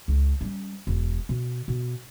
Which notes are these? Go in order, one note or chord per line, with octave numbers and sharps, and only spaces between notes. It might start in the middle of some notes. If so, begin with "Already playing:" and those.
C#2
G3 C#4
E1
B2
B2